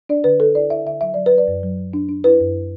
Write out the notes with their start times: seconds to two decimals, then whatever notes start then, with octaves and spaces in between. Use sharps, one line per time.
0.09 D4 D5
0.24 D3 B4
0.40 D3 A4
0.55 E4 D5
0.70 E4 E5
0.85 D3 E5
1.01 F#3 E5
1.14 F#3 D5
1.26 B4
1.32 F#3
1.38 D5
1.48 F#2
1.63 F#3
1.78 F#3
1.93 D4
2.09 D4
2.24 E4 B4
2.40 F#2